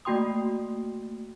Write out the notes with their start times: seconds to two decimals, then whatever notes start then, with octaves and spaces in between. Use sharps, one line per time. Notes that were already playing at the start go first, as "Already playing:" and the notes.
0.05 A3 A#3 F#4 G5 C6 D#6